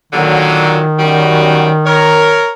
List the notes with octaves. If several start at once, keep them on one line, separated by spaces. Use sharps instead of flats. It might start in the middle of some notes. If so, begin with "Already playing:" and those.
A#2 D3 D#3 F#3
F#2 G3 F#4
A#4 C#5